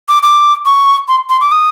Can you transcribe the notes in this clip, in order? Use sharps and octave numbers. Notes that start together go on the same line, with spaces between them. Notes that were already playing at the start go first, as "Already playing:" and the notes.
D6
D6
C#6
C6
C6
D6
D#6